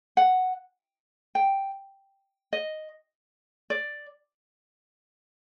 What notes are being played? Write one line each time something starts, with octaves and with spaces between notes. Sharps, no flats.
F#5
G5
D#5
D5